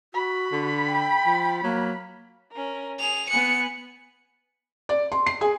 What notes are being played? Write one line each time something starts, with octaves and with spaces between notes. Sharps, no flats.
F#4 B5
D3
G5
F3
F#3 A#3
C#4 A#4
G#4 F7
B3 G#5 F#6 C#7
D5
C6
C7
G#4